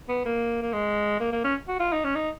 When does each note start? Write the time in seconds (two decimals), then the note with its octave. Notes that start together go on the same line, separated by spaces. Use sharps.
0.09 B3
0.25 A#3
0.62 A#3
0.73 G#3
1.20 A#3
1.33 A#3
1.44 C#4
1.68 F#4
1.80 F4
1.93 D#4
2.05 C#4
2.16 D#4